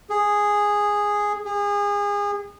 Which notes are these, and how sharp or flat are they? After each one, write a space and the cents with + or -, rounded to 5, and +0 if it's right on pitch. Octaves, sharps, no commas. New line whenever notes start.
G#4 -5
G#4 -30